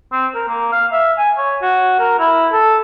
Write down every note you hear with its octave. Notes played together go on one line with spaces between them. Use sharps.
C4
A#4
A#3
F5
E5
G#5
C#5
F#4
A#4
E4
A4